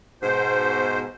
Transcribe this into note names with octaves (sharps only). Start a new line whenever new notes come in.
G#2 B2 C5